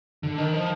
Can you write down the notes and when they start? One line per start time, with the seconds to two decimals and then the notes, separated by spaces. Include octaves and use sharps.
0.23 D3
0.38 D#3
0.53 F3